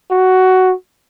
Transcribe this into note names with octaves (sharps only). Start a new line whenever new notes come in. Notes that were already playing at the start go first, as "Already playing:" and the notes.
F#4